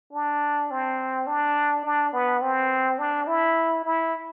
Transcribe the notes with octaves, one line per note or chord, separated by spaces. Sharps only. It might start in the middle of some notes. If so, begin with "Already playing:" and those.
D4
C4
D4
D4
B3
C4
D4
E4
E4